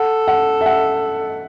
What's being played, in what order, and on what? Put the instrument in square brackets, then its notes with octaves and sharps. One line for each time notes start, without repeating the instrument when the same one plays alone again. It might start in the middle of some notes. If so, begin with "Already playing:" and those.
Already playing: [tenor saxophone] A4 [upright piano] F#5
[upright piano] F#5
E5
F#5